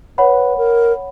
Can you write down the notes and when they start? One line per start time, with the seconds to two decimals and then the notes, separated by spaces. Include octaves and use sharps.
0.18 B4 C#5 F#5 B5
0.58 A#4